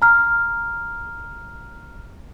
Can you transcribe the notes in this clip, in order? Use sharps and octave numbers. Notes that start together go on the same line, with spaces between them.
A#5 F6